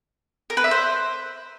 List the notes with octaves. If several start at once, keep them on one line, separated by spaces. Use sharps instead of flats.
A#4
B4
E5
C5